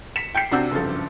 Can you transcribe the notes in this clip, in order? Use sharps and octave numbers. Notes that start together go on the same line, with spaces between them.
B6 C#7 E7
G5 G6 B6 C7
C3 D4 F#4 D6 E6 G6
F#1 G2 F3 A4